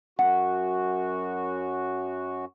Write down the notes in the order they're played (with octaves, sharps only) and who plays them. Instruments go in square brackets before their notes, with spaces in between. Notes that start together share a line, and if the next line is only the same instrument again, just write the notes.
[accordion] F#2 F#4 [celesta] F#5